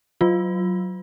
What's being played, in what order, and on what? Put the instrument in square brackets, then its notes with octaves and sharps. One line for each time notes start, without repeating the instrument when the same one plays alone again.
[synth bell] F#3 F4